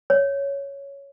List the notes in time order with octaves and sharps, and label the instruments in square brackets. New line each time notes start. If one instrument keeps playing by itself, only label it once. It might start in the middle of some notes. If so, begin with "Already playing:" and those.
[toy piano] C#5